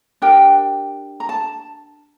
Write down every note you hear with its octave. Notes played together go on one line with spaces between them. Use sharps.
D4 G4 A#4 G5
A#5
A5